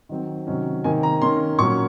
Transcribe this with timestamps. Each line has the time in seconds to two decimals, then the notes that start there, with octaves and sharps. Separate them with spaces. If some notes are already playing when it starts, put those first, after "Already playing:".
0.09 D#3 F#3 C4
0.47 C3 D#3 F#3 C#4
0.84 C3 D#3 A#3 G#5
1.03 A#5
1.22 D#3 A#3 C#4 C6
1.59 A#2 F#3 A#3 C#4 C#6